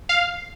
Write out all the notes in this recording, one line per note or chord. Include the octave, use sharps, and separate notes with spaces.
F5